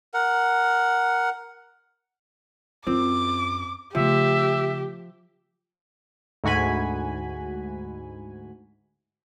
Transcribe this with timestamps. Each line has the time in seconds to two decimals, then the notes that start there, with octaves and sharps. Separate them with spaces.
0.14 A#4 F#5
2.87 F#2 C4 F4 D6
3.95 C#3 F3 A3 G4 E5
6.44 D2 G#2 F#4 G#5 B5